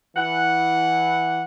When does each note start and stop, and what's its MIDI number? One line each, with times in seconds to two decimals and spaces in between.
0.16 1.44 52
0.16 1.44 78